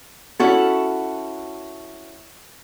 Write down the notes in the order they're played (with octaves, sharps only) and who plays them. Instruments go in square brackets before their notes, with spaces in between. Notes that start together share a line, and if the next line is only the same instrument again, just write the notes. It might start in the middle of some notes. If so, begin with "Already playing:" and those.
[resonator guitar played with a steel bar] C#4 E4 F#4 A4